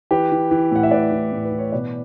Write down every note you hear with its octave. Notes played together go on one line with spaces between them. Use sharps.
E3 G4 B4
E3
E3
A2 F#5
E5
A2 B4 D5
E3
A2
B4
E3
C#5
B2 B4 D5